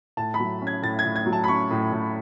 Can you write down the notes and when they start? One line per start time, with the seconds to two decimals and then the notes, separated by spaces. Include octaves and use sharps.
0.17 A2 A5
0.34 B5
0.40 F#3
0.62 C#4
0.67 G#6
0.82 A2 A6
0.99 G#6
1.05 A2
1.16 G#6
1.26 F#3
1.33 A5
1.44 B5
1.48 C#4 C#6
1.71 A2
1.92 A2